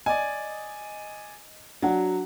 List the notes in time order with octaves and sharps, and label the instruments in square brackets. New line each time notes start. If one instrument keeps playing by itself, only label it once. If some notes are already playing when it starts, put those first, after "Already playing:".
[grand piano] D5 G#5 [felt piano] D#5
[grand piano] F#3 [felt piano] D4 F#5